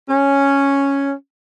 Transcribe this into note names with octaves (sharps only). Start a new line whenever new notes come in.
C#4